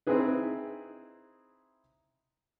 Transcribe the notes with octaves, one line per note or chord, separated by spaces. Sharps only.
C4 D#4 E4 G#4 B4